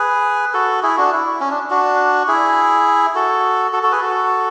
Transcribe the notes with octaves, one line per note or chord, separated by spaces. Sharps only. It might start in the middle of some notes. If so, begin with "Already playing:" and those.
Already playing: G#4 B4
F#4 A4
E4 G#4
D4 F#4
E4
C#4
D4
D4 F#4
E4 G#4
F#4 A4
F#4 A4
F#4 A4
G#4 B4
F#4 A4